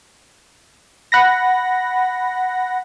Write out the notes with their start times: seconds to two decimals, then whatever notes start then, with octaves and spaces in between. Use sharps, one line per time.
1.12 F#5 B5 A#6